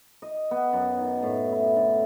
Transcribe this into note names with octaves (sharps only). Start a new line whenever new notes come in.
D#5
B3
F#2
D#3
A2
E4
D3